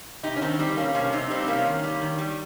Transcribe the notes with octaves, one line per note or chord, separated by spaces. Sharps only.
C3 D#4 G4
C#4
D#3 C4 D#4
G3 C4 D#4
G3 A#3 C#4
C3 A#3 C#4
C3 C4 D#4
G3 C4 D#4
C3 A#3 C#4
D#3
G3
D#3
G3